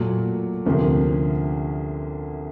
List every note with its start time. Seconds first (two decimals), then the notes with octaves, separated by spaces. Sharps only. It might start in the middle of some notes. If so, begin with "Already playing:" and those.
Already playing: A#2 F#3 A3
0.66 D2 C3 F3 A#3 C#4